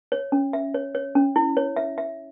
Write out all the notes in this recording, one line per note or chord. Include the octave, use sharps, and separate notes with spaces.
C#5
C#4
E5
C#5
C#5
C#4
E4
C#5
E5
E5